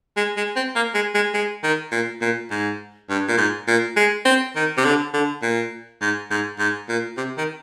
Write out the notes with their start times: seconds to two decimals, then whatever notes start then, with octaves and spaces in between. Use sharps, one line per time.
0.17 G#3
0.37 G#3
0.56 C4
0.76 A#3
0.94 G#3
1.15 G#3
1.34 G#3
1.63 D#3
1.91 A#2
2.21 A#2
2.51 G#2
3.09 G2
3.28 A#2
3.38 G#2
3.67 A#2
3.96 G#3
4.25 C4
4.55 D#3
4.77 C3
4.85 D3
5.13 D3
5.42 A#2
6.01 G#2
6.31 G#2
6.59 G#2
6.89 A#2
7.17 C3
7.38 D#3